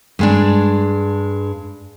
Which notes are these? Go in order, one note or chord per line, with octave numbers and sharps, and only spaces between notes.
G2 G#3 D4